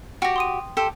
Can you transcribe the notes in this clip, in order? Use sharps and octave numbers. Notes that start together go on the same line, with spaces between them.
F#4 G4 G5 A#6
C6 D#6 D#7
G4 A4 C5